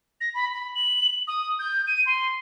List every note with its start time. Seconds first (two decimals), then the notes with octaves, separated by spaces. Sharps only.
0.21 A#6
0.34 B5
0.53 B5
0.75 F#7
1.27 D#6
1.59 G6
1.87 D#7
2.06 C6